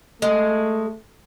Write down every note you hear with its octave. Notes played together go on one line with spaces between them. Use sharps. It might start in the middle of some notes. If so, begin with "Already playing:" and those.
G#3 A3